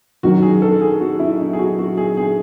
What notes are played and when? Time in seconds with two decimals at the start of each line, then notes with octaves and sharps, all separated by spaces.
0.23 F#2 D#3 F#3 F#4
0.42 G#4
0.62 A4
0.81 G#4
1.00 F#4
1.19 E4
1.39 D#4
1.53 G#4
1.59 F#4
1.79 F#4
1.97 G#4
2.17 G#4